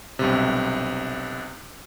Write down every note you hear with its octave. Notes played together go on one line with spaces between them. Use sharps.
B1 G2 C3